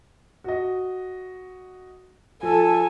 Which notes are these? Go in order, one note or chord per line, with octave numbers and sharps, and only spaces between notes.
F#4 D#5
F3 A4 G#5 A5